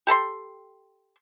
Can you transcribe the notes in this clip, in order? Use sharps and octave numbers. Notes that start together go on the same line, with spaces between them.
G4 A4 A#5 C6